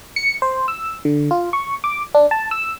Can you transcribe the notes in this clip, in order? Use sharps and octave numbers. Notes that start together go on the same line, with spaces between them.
C#7
C5
E6
D3
F4
C#6
D6
D4
A5
E6